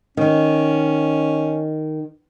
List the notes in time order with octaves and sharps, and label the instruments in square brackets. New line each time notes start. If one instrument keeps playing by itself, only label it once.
[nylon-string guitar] D#3 [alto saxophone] C#4